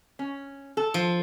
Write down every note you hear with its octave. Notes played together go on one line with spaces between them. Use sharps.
C#4
A4
F3